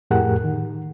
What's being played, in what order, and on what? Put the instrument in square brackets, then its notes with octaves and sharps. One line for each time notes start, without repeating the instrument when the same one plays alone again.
[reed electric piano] F2 A2 G4 G#4 A#4 F#5
D#3